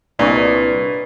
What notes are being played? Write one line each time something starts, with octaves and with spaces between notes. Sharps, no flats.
C2 A#2 D4 B4 C#5 D#5